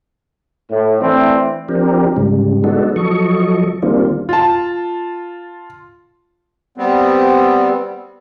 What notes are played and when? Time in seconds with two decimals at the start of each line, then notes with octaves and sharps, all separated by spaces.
0.71 A2
1.00 E3 A3 C4 D4
1.69 F3 C4 D4 G4 A#4
2.17 G#2 C#3 G3
2.64 G#3 B3 D4 D#4 F#4 A4
2.96 F3 F#3 A4 D#5 C#6
3.82 D#3 G3 A#3 C4 D4 F4
4.29 F4 A5
6.78 G3 B3 C4